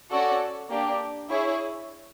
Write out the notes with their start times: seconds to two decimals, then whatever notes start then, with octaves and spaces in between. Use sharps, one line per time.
0.10 C#4 F#4 A4 D5 F#5
0.69 A#3 D4 G4
1.29 E4 G#4 C#5